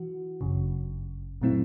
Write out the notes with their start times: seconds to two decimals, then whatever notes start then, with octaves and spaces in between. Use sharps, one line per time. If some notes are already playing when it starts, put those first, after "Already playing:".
Already playing: E3 F#4
0.41 G1 F#2 C#3
1.41 A#2 F#3 A3 C4 E4